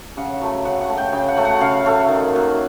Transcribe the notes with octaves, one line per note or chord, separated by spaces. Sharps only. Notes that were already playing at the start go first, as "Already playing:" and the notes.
C#3 F#5
F#3 A3
C#3 F#5
F#5
F#3 A3
G5
C#3 G5
F#5
F#3 A3
F#5
C#3 F5
F#3 A3
D#3
F#3 A#3